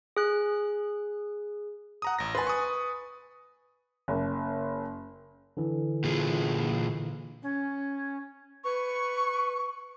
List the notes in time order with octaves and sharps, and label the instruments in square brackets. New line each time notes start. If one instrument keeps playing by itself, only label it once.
[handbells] G#4 F#6
[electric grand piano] F#5 A#5 D#6
A1 A#6
[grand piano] B4 G#5 [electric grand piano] C6 A6
[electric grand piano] C#6 D#6
[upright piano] F#1
[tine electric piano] D3 E3
[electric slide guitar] A#2 F4 G#4
[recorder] C#4
[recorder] B4 [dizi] C#6